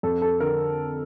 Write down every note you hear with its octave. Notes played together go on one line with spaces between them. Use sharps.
F2 A4
A4
D3 A#4